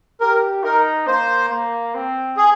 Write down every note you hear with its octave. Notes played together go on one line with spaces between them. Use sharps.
G4 A#4
D#4 A#4
A#3 C5
A#3
C4
G#4